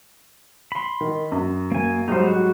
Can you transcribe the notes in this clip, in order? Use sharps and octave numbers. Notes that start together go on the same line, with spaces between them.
B5 C6
D#3
F#2
A#3 G#5
G#2 F#3 G3 D#4 C5
F#4